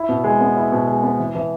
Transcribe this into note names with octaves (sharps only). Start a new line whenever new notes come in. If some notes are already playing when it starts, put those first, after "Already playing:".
Already playing: E4
B2
G#3
B3
E4
B2
G#3
B3
E3
E3